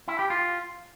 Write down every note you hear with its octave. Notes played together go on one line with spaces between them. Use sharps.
E4
G4
F4